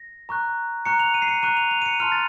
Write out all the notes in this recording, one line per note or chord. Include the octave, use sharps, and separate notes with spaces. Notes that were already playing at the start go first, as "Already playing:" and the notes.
Already playing: A#6
A#5 C#6 F#6
A#5 C#6 F#6 C#7
F7
D#7
C7
C#7
A#5 C#6 F#6 D#7
F7
F7
D#7
C#7
A5 C6 F6 F7
A6